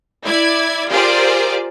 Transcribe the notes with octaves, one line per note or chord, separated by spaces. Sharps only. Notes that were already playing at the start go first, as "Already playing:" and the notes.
E4 D5 G#6
F4 G4 G#4 A#4 C5 D5